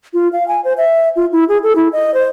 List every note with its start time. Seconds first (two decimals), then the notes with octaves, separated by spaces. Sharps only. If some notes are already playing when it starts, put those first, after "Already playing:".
0.14 F4
0.33 F5
0.48 G#5
0.65 C5
0.77 E5
1.16 F4
1.32 E4
1.49 G#4
1.63 A4
1.76 E4
1.93 D#5
2.14 C5